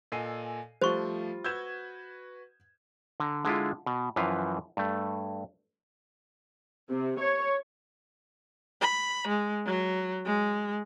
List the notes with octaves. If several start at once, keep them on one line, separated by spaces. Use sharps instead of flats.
A#2 A4 D#5 G#5 C7 D#7
F3 G3 A3 F4 C5 C#6
F#4 B4 E6 G6 G#6 E7
D3 A#5
D3 G#3 E4 F4
B2
F#2 E3 F3 B4 F5
G2 A3
C3
C#5
B5
G#3
F#3
G#3